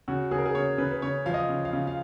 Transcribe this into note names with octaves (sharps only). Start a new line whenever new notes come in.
C#3 F#4
C#3 G#4
A#4
G#4
C#3 C#5
C#3 B4
B4
C#3 C#5
F3 F5
D#5
C#3
F5
C#3
F5